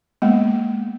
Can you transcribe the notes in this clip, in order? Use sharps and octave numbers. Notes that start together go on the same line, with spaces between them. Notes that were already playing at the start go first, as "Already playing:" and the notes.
G#3 A#3 B3